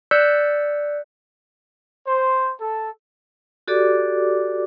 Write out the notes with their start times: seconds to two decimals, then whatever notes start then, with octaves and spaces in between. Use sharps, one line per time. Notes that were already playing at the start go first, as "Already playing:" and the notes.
0.11 D5 E6 F#6 G6 B6 C#7
2.07 C5
2.59 A4
3.68 F#4 G4 A4 D5 D6